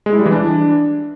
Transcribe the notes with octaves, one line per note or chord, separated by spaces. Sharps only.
G#3
E4
G3
E3
D4